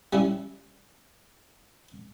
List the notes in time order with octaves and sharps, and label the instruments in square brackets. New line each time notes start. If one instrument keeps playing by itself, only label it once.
[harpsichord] G3 C#4 E4